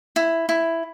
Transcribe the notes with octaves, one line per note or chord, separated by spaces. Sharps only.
E4
E4